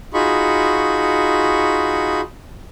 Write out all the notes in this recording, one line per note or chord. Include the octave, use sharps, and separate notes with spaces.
D#4 F4 F#4 G#4 B5 C#6